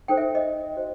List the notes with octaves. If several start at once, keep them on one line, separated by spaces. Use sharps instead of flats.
D#4 A4 C5 G5
E5
D#5
F#4 C5